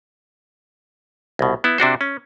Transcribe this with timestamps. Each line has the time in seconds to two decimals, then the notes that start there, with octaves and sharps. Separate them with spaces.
1.39 C2 B2
1.64 B3 E4
1.78 C3 D4 F#4 C5
2.01 C#4